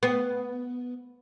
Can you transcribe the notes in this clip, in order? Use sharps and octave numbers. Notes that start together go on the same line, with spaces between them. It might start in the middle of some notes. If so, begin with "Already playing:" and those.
B3